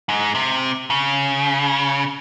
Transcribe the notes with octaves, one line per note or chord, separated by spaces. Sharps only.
G#2
C3
C#3